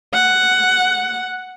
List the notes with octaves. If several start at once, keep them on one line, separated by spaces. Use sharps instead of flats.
F#5